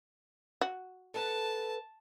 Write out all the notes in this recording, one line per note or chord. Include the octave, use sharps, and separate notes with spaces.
F#4
A4 B4 F#5 A5